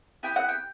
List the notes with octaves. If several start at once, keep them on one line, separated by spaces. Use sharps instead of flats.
B3 E4 G4 G5
F#5
G5